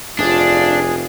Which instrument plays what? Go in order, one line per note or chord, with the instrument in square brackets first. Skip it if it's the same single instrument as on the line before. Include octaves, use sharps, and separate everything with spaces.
[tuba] F1 [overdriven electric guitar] D4 [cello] F4 [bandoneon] G#4